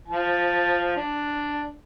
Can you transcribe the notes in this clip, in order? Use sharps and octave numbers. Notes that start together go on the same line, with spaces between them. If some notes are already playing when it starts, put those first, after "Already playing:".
F3 A5
D4